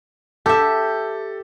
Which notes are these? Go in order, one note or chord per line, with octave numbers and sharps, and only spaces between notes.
G4 A4 E5